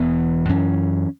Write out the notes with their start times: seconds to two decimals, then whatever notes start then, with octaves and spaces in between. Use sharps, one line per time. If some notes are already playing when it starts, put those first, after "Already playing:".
Already playing: E1 E2 E3 B3
0.49 F#2 E3 C#4